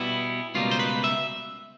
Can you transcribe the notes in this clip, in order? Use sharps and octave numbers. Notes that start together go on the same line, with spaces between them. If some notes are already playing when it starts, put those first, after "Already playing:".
Already playing: B2 G3 B3 E4
C#2 B2 G3 A#3 F4
C5
B4
E5